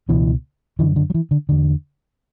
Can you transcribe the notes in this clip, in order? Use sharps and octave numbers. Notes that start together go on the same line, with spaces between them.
C#2 B2 E3
F#2 D3 E3
D3
F#3
E3
D3
E2 D3